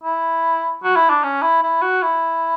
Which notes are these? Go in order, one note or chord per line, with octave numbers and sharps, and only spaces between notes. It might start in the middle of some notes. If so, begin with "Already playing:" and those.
E4
F#4
E4
D4
C#4
E4
E4
F#4
E4